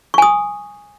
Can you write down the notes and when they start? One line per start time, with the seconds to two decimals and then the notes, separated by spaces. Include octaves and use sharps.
0.14 C#6
0.18 G#5
0.22 D#6